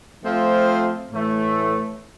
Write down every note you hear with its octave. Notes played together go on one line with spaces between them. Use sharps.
F3 A3 C4 F4
A2 E3 A3